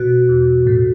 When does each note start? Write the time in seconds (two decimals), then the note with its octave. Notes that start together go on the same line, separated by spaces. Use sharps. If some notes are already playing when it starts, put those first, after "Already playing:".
Already playing: B2 F#4
0.29 E2
0.67 A2